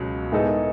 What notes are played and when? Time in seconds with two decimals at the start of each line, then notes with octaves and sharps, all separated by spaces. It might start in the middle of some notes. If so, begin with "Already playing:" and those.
Already playing: C#2 B2 F#3
0.32 A2 G#3 B3 D#4 A4